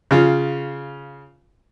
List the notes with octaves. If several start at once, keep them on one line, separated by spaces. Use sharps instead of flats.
C#3 F4